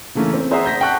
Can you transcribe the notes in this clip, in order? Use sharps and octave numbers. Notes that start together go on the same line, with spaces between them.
C#3 E3 A3 A#3 C#4
C4
G#4 C5 E5 F#5 A#5 D#6
G6 A#6 B6
F#5 G5 A5 C#6 F#6